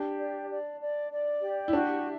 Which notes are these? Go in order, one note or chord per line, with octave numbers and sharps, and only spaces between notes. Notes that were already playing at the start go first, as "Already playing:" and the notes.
Already playing: D4 G4
D5
D5
D5
D5
G4
E4
D4 F#4
E5